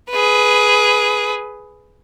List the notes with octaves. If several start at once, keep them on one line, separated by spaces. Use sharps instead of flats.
G#4 B4